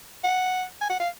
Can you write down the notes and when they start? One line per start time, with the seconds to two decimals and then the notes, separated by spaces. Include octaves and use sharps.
0.24 F#5
0.81 G#5
0.90 F#5
1.00 F5